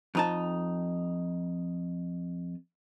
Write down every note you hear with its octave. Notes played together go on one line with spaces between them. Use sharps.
F2 D#4 A5